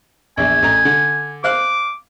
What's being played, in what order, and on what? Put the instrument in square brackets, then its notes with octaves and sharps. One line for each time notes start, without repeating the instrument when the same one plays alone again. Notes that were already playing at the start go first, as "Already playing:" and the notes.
[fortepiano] A#1 E2 [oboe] G#5
[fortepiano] A1 A#5
D3
[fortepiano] C5 F5 F#6 [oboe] D6